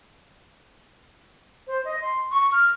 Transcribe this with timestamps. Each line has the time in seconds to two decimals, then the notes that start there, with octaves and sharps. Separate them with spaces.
1.67 C5
1.85 D#5
2.01 C6
2.31 C#6
2.52 F6